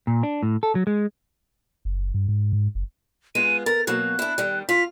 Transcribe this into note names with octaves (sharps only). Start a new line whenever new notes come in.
A#2
D4
A2
A4
F#3
G#3
F#1
G2
G#2
G#2
F#1
G#3 B3 F4 D#7
A#4 A6
B2 F#3 A#3 F#6
D4 E4
D#3 G3
F4 B6